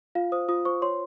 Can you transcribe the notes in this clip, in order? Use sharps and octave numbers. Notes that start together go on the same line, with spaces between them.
F4 F5
C5 D#6
F4 D#6
C5 C#6
C#5 C6